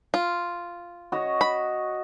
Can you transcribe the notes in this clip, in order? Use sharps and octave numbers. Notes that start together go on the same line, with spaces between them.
F4
F#4 C#5 D#5
B5